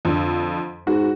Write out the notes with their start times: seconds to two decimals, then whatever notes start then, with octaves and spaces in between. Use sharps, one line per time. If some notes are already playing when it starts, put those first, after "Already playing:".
0.05 F2 D3
0.87 G#2 F#4